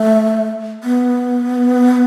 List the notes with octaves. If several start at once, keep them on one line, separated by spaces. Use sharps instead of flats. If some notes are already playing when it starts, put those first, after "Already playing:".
Already playing: A3
B3